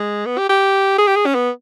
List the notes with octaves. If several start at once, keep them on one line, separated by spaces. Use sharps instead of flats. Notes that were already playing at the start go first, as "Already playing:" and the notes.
Already playing: G#3
B3
G4
G4
G#4
G4
G#4
C#4
B3